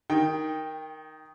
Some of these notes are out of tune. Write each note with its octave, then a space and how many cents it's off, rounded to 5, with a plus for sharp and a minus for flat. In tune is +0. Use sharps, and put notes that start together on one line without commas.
D#3 +0 G5 +15